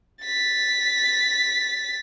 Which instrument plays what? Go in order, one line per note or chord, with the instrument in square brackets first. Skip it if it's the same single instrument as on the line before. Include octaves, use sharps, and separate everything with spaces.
[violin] A6 B6